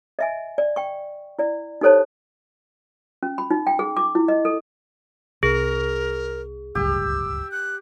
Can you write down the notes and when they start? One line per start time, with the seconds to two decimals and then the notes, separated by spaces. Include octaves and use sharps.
0.19 D#5 E5 G#5
0.58 D5
0.76 G5 C#6
1.39 E4 D5
1.81 D#4 G4 A4 C5 C#5 A5
3.23 C#4
3.38 B5
3.51 D#4
3.67 G5
3.79 G#4
3.97 D6
4.15 E4
4.28 D#5
4.45 A4
5.43 C2 G#4 A#4
6.75 D1 G1 C#2 G4 E6
7.51 F#6